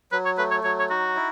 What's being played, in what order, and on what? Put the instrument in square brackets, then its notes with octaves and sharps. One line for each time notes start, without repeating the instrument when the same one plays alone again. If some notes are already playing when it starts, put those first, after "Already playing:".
[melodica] F#3 [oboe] B4
[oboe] C#5
[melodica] A3 [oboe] B4
[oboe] C#5
[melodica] F#3 [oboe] C#5
[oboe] C#5
[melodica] D#4 [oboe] F#4
[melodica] E4